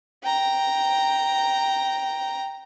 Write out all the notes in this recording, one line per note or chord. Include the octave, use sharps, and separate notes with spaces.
G5 A#5